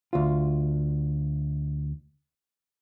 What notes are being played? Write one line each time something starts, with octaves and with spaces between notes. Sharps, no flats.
D2 F4